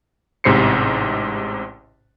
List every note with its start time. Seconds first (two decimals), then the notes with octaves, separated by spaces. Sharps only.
0.44 A1 G#2 C3 C5 C7 C#7